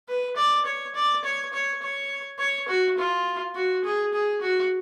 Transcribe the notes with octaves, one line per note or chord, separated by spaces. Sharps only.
B4
D5
C#5
D5
C#5
C#5
C#5
C#5
F#4
F4
F#4
G#4
G#4
F#4